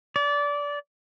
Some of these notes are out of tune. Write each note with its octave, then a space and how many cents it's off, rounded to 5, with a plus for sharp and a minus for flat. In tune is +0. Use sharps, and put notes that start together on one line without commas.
D5 -20